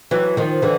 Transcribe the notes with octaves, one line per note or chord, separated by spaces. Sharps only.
E3 F#3
D#3 F3
D3 E3